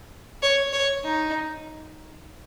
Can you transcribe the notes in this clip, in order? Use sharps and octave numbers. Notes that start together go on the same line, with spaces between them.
C#5
C#5
D#4